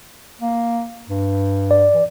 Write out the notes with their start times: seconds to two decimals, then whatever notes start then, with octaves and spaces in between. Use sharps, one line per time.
0.41 A#3
1.09 G2
1.71 D5
1.94 E3